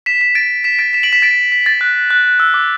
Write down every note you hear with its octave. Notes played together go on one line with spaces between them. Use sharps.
B6 E7
B6 E7
A6 D7
B6 E7
A6 D7
B6 E7
D7 F#7
B6 E7
A6 D7
B6
A6
F#6
F#6
E6
D6